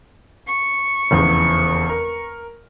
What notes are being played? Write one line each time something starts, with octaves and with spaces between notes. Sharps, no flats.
C#6
F1 E2 C#3
A#4